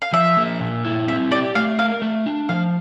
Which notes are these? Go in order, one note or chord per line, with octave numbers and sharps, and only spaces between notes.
F5
F3 E5
A#3
A#2
E4
C4 E5
G4 D5
A3 F5
A#4 F5
A3
D4
F3 F5